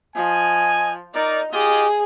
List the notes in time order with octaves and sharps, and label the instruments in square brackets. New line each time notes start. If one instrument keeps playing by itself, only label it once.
[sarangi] F3 [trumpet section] D#5 G#5
[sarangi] D#4 [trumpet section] A#4 D5
[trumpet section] F4 G4 D#5 [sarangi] G#4